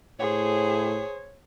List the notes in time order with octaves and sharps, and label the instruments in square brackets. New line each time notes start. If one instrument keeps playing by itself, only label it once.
[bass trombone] A2 [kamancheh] G#4 C5 [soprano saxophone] C#5